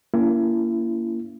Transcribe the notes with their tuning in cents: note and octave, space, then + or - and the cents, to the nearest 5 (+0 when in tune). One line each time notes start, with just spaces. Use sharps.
A#3 +0 C#4 +40 E4 +35